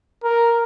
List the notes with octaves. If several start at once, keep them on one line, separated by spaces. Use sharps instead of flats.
A#4